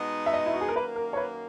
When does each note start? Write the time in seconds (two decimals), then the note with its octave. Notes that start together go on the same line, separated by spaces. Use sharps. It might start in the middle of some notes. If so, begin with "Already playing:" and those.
Already playing: B2 G#3 B3 D#4
0.26 E5
0.33 D#5
0.46 E4
0.53 F#4
0.61 G#4
0.68 A#4
0.76 F#2 D#3 A#3 B4
0.96 A#4
1.13 C#5
1.17 B4